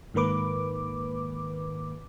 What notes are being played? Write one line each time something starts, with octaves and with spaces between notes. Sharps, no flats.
G#2 D#3 A#3 B4 D6